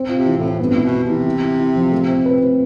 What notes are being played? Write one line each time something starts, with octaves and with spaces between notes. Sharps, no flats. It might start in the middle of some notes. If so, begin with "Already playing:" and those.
Already playing: C4
F4
C3
E3
A2
C4
G2 B3
B2 E4
B3
C3
E3
E4
E4
E4
F3
A3
C4
B4
C4